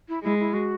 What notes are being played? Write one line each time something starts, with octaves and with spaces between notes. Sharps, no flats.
E4
G#3 E4
E4
F#4